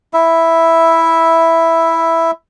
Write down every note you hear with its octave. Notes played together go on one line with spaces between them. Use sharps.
E4 E5